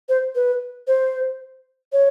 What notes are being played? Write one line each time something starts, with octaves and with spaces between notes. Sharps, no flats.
C5
B4
C5
C#5